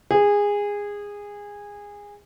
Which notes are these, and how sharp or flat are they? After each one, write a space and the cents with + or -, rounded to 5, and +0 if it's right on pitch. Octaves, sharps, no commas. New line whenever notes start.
G#4 -20